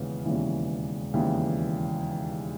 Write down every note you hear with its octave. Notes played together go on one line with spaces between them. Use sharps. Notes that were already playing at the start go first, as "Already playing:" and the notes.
Already playing: E1 D#2 C#3 E3 B3 C#4
E1 D#2 C#3 E3
E1 D#2 C#3 E3